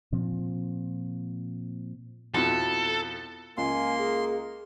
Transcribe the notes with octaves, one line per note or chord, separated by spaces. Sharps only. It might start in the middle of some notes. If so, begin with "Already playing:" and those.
A#2 F3 C4
F2 B2 E4 A4
C#2 A#3 G#5 C6
G#4